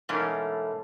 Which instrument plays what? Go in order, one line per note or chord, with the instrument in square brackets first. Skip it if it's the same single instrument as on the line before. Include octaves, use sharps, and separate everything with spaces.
[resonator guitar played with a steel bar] G#2 B2 E3 A3 A#3 C#4